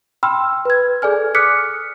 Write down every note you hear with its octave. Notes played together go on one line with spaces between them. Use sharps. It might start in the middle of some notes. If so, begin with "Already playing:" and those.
G5 B5 C6 E6 F6
B4 G#6
G#4 A4 D5 G#5 F6
D6 D#6 F6 F#6 B6 C#7